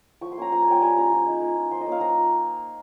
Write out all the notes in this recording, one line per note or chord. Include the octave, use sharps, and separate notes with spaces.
F3 C#6
C6
A#3 C#4 A#5
F3 A#5
G#5
A#3 C#4 F4 G5
G3 G#5
C#4 F4 A#5
F3
G#3 D#4
A#3
F4
F3 C6
D#5
A#3 C#4
F5
F3 A#5